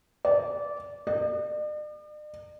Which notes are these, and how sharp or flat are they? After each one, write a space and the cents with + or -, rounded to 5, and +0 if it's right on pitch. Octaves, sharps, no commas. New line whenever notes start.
D5 -15
D5 +45